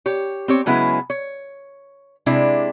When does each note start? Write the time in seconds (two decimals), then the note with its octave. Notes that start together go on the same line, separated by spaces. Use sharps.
0.06 G4 C#5
0.48 C4 G4 C#5
0.66 C#3 F#3 G#3 B3 E4 G#4
1.10 C#5
2.26 C3 G#3 D4 E4